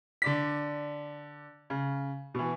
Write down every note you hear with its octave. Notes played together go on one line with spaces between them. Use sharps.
D3 D5 B6
C#3
B2 E3